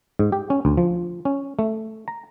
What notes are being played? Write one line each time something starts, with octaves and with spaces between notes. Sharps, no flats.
G#2
G4
C#4
D2
F3
C#4
A3
A#5